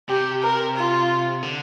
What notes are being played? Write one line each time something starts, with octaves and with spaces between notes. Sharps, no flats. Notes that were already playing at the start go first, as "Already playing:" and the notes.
C3 G4
A#4
F4
D3